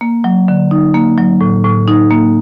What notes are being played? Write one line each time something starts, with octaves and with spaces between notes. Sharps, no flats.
A#3
F#3
D3
D#4
A#3
F#3
A2
A2
D#4
A#3